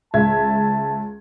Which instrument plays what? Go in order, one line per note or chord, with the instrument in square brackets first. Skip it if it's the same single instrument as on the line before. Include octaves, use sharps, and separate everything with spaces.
[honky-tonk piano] C#2 E5 G#6 [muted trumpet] A5